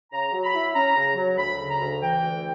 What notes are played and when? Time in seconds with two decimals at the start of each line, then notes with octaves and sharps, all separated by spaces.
0.13 C#3 A#5
0.32 F#3
0.44 B5
0.55 E4
0.75 C#4 A#5
0.95 C#3
1.16 F#3
1.37 D2 B5
1.59 C#3
1.70 A#5
1.80 D2
2.01 E3 G5
2.21 D2